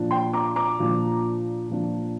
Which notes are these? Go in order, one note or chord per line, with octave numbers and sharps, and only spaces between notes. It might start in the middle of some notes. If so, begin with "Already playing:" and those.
Already playing: A#2 F3 D4
G5 C6
A#5 D6
A#5 D6
A#2 F3 D4
A#2 F3 D4